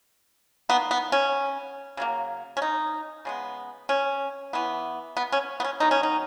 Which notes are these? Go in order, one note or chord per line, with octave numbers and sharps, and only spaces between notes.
D#3 A#3 B3
B3
C#4
C#3 F#3 A#3
C#4
D#4
C#3 G#3 B3
C#4
E3 B3
B3
C#4
B3
C#4
D#3 F#3 B3 D#4
C#4
D#4